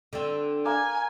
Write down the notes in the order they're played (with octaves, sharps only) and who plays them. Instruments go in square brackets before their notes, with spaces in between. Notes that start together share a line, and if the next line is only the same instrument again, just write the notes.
[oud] D3 C4
[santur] A#3 [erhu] G#5